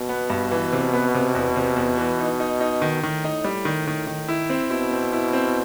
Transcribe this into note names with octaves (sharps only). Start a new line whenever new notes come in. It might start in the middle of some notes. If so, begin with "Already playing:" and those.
Already playing: B2
B3
G2
E3
C3
B3
C3
E2
C3
E2
E3
D#4
D#4
D#4
D#3
A2 D#3
D#4
G3
D#3
D#3
D#3
E4
C4
B2 E4
C4
E4
C4